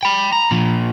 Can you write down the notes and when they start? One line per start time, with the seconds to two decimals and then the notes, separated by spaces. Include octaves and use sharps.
0.03 G5 B5
0.32 A#5
0.51 A#2 F3